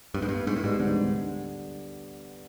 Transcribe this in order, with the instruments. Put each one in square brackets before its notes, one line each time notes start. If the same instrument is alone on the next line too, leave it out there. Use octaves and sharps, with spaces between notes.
[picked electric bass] G2 [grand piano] B3
[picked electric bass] G#2
[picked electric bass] G2 [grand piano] B3
[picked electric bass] G#2 [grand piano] B3
[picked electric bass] A2
[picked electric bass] G#2 [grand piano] G3
[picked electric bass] G#2 [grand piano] D3
[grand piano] D3